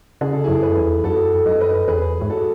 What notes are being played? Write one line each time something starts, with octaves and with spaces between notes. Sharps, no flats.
C#3 G#4
A4
F#2 E4 G#4
G#4 B4
E2
F#2 F#4 A4
F#2 D#5
B4 D#5
E2 G#4 B4
G#2
F#4 A4